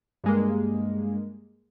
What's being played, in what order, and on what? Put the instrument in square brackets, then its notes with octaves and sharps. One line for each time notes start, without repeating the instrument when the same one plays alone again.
[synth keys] G2 G#3 A#3